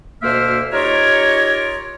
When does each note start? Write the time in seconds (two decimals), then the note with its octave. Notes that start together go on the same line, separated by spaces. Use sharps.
0.23 D2 B2 A#3 C5 E5 F6
0.72 D#4 F4 G4 A#4 C#5